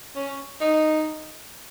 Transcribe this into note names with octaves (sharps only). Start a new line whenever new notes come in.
C#4
D#4